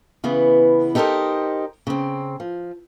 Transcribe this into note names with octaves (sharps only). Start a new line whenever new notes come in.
C#3 E3 B3
D#4 G4 A4 A#4 C5 D#5
C#3 C4
F3